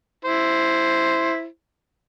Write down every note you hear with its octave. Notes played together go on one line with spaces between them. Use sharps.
E4 C5